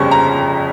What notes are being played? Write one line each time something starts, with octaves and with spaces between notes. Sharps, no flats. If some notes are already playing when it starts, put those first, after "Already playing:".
Already playing: G1 F2 C#3 G3 C#4 C#6
A#5